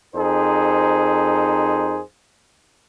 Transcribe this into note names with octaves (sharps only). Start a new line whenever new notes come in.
F2 D#4 G#4 A#4 C5